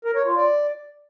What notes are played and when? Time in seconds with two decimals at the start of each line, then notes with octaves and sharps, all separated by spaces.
0.05 A#4
0.15 C#5
0.26 F4
0.36 D5